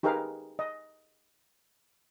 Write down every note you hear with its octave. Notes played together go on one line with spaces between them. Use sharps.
D#4 G4 G#4 A#4 B4 F5
D#5